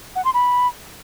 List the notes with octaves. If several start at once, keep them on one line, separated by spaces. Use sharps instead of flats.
F#5
C6
B5